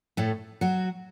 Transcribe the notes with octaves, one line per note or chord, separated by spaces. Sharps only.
A2 A3
F#3 F#4